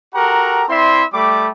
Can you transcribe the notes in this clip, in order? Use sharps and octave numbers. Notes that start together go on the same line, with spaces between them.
F#4 G4 A4 A#4 F#5 A#5
C4 E4 D5 E5 C6
G3 A3 G5 B5 D6